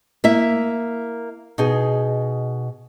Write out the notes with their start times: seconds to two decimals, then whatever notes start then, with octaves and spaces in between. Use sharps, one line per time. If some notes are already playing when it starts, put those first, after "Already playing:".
0.24 A#3 E4 E5
1.58 B2 D#4 G#4